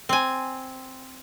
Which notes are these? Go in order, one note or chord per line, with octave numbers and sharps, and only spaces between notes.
C4 G#5